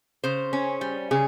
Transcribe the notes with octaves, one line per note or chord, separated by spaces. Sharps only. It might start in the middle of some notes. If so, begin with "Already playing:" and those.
C#3 C5
C#4
G3
C#3 G#4